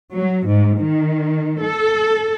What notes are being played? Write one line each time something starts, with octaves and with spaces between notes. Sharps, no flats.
F#3
G#2
D#3
A4